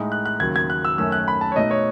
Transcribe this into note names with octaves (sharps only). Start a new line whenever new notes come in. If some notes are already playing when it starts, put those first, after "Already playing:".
Already playing: A2 G#3 D#4
F#6
F#6
D#2 C#3 F#3 G#6
G#6
F#6
E6
F#2 D#3 A3 C#4 E6
F#6
B5
A5
C#5
B2 A3 D#4 D#5
C#5